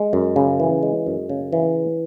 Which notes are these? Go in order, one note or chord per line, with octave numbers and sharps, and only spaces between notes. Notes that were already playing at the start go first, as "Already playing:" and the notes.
Already playing: G#3
F#2
C#3
E3
G#3
F#2
C#3
E3